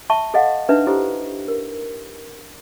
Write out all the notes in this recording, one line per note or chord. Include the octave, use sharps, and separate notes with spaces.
E5 A5 C#6
A4 D#5 F5 F#5
D4 D#4 B4 E5
E4 G4 A4 C5
A#4